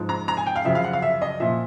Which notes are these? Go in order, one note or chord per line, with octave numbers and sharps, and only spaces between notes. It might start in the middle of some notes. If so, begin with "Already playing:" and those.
Already playing: G#2 F3
A#5
A#5
G#5
G5
F5
F#2 C#3 F3 E5
F5
F#5
F5
E5
D#5
A#2 F3 E5